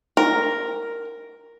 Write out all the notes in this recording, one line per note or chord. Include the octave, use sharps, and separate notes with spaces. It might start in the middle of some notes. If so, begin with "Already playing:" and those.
A#4